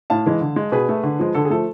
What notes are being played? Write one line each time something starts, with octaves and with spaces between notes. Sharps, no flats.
A2 F5 A5
E3 G#3
D3
G#3
B2 G#4 B4
A3
D3
F3 G#3
D3 A4
G#4
F3 A3 A4